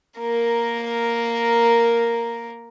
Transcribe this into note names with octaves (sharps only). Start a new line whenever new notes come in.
A#3 A#4